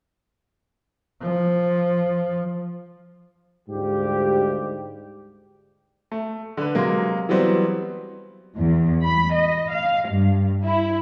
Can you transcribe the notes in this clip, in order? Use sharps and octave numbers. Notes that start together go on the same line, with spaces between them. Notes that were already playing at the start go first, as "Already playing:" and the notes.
F3
D2 G#2 G3 F4 G4
A3
D3 B4
C3 F#3 G#3 A#3
E3 F#3 G3 B3 C4
E2
B5
D#5
F5
G2
E4